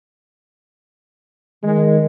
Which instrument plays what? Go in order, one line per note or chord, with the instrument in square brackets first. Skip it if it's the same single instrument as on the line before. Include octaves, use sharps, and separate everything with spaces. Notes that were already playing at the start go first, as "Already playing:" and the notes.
[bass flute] D#3 [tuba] G#3